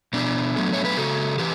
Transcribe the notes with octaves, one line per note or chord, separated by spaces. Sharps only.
B2 B3 D4
F#3 A3
C#5
B4
C#3 F#4 A4
E3 G4 B4